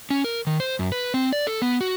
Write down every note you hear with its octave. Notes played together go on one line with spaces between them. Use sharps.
C#4
A#4
D#3
C5
F#2
B4
C4
D5
A4
B3
F#4